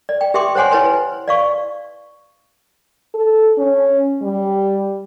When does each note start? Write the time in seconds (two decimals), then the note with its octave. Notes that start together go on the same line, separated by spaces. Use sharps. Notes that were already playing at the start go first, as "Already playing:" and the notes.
0.09 D5
0.21 G5
0.34 G4 E5 G5 C6 D6
0.55 C5 C#5 F#5 G#5 C6
0.71 E4 B4 C#5 G#5 C6
1.28 D5 F5 C#6
3.14 A4
3.58 C#4
4.22 G3